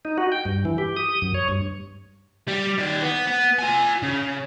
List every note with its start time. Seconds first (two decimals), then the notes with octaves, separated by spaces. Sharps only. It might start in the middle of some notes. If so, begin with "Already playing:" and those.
0.05 D#4
0.18 F#4
0.32 G5
0.45 G2
0.65 E3
0.78 G4
0.97 D#6
1.22 F#2
1.34 C#5
1.49 G2
2.48 G3
2.79 D#3 D5
3.02 B3
3.27 B3
3.59 F4 G#5
4.03 C#3